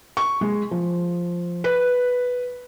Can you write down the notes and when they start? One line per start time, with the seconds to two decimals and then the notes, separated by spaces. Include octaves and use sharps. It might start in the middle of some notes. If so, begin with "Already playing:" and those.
0.17 C#6
0.41 G#3
0.71 F3
1.64 B4